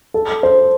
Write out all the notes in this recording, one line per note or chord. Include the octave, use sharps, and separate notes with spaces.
A4
C5